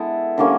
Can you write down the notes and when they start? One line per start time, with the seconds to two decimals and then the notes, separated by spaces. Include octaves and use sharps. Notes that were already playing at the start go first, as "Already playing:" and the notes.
Already playing: G#3 B3 E4 A4
0.38 D3 G3 A#3 C#4